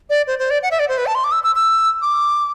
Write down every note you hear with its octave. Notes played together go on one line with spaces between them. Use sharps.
D5
C5
C5
D5
F#5
E5
D5
C5
B4
A5
C6
D6
E6
E6
E6
D6